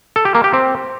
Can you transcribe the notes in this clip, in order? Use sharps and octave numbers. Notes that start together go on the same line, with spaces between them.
A4
G4
A#3
G4
C4